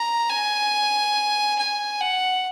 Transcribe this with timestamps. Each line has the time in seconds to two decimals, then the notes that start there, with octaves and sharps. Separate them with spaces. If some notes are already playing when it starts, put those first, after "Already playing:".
Already playing: A#5
0.29 G#5
1.58 G#5
2.01 F#5